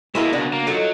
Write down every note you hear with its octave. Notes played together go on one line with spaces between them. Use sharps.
B2 G#3 A#3 E4 A#4
C#3 D4 F#4
A#3
F#3 D#4 F4 A4